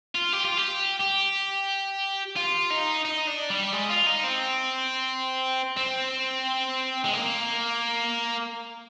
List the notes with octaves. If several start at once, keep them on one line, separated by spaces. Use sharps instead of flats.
F4
G4
F4
G4
G4
F4
D#4
D#4
D4
G3
G#3
F4
D#4
C4
C4
G#3
A#3